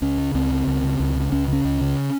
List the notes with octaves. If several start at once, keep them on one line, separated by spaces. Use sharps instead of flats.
C#2 C#4
C#3
C#2 C4
C#3
C#2
C#3
C#2
C#3
C#2 C#4
C#3
C#4
C#2
C#3